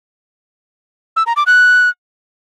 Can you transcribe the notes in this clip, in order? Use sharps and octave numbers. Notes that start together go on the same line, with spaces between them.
E6
A#5
D6
F#6